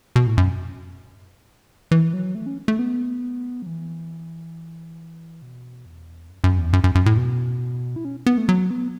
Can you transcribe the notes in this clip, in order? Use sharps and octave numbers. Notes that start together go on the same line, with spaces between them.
B2
A2
F#2
E3
F#3
A3
C#4
A3
B3
F#3
E3
B2
E2
F#2
F#2
E2
F#2
F#2
F#2
A2
B2
E4
C#4
B3
A3
F#3
B3